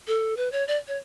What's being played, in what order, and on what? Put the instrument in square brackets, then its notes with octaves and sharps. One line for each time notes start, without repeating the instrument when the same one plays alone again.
[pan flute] A4
B4
C#5
D5
C#5